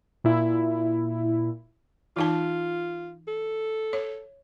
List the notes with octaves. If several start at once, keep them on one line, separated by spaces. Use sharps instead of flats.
A#2 E4
E3 D#4 F4 A5
A4
C#5